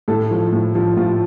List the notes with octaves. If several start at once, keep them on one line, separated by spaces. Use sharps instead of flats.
A2 A4
F3
A2
F3
A2 F4